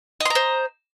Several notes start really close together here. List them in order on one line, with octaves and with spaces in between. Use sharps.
D#5 C6 A#5 C5